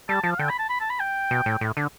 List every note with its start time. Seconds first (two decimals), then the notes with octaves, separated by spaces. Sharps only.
0.09 G3 A5
0.23 F3 A5
0.32 F5
0.39 D3 G5
0.49 B5
0.59 A5
0.69 B5
0.80 A5
0.90 B5
1.00 G5
1.31 B2
1.46 A2
1.61 A2
1.77 D3